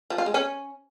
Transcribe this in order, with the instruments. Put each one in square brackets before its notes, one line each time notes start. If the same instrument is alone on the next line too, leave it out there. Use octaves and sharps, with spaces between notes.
[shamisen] F3
F4
G#3
C#4